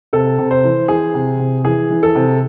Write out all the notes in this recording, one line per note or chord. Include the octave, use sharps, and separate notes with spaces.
C3 A4
C3
C5
E3
E3 G#4
C3
C3
E3 G#4
E3
A4
C3